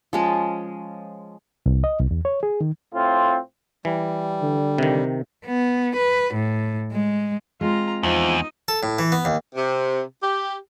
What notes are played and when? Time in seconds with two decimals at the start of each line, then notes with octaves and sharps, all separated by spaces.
0.13 F3 G#3 C#4
1.66 C2
1.84 D#5
1.99 C2
2.11 E2
2.25 C#5
2.43 G#4
2.61 D#3
2.94 A2 C4 F4
3.85 E3 G3
4.42 D3
4.78 C3 D#3
5.46 B3
5.96 B4
6.34 A2
6.93 G#3
7.61 G#3 C4 F4 A#5
8.03 E2 F3 D#4 D#5
8.68 A4
8.83 A2
8.99 E3
9.12 B3
9.25 D#2
9.55 C3
10.22 G4